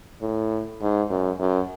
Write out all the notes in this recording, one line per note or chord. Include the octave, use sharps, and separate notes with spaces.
A2
G#2
F#2
F#2